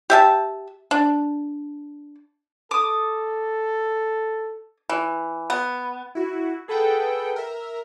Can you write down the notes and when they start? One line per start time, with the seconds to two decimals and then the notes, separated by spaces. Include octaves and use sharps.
0.10 G4 E5 A5
0.91 D4
2.71 A4 D6 D#6
4.90 E3
5.50 B3
6.15 E4 F#4
6.68 G#4 A4 B4 F#5 G5
7.36 A#4 E5